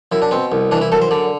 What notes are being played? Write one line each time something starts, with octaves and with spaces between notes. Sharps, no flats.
F#2 E4
D4
B2 C4
C2
E3 D4
E4
F#2 A4
C5
D3 D5